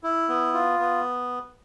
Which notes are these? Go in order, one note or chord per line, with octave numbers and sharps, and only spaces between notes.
E4
B3
F4
B3